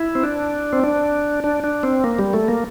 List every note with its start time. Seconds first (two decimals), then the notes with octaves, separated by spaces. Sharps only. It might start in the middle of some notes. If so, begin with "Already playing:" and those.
Already playing: E4
0.15 C4
0.24 D4
0.73 C4
0.84 D4
1.44 D4
1.64 D4
1.83 C4
2.04 A#3
2.19 G3
2.33 A3
2.48 A#3